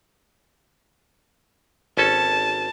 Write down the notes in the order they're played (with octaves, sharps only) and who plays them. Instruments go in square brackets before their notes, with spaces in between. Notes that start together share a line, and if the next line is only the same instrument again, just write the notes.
[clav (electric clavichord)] G#1 C#4 A4 [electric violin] A5